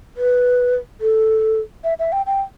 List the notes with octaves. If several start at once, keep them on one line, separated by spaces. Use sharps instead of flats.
B4
A4
E5
E5
G5
G5